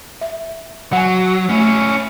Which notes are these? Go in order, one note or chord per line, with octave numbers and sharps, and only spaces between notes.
E5
F#3 F#5 G#5
A3 C#4 E4